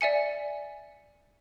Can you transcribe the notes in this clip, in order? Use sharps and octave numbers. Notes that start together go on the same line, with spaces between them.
D5 E5 G#5 C#7